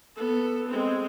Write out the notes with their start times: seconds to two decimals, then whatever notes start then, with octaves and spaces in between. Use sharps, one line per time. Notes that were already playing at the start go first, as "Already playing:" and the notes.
0.16 B3 A4
0.69 G#3 C4